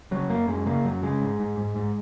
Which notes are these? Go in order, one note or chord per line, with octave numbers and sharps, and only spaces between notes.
C#3 F#3
F#2 A#3
F#2 G#3
C#3 A#3
F#2 F#3
C#3 G#3
G#2
G#2
G#2
G#2